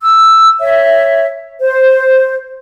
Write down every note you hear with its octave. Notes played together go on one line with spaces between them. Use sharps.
E6
C#5 E5
C5